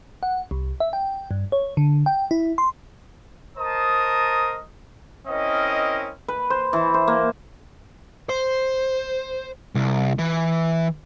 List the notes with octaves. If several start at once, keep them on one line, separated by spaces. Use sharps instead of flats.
F#5
C2
E5
G5
G2
C#5
D3
G5
E4
C6
A#4 C5 D#5 A5 A#5 D#6
C4 C#4 E4 A#4 D#5
B4
C5
E3
C5
A#3
C5
C2
E3